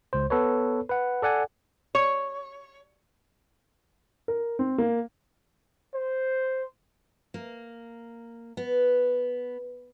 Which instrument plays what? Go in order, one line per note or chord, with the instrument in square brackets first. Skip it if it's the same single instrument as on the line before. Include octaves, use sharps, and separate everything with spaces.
[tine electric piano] C#2 C5
B3 A4 B4 C#5
B4 F#5
A4 D5 F#5 G#5
[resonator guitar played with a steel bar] C#5
[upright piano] A#4
C4
A#3
[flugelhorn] C5
[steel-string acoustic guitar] A#3
B3